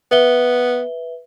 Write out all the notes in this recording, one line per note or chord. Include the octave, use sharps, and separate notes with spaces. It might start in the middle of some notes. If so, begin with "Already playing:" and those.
B3 B4 E5 G7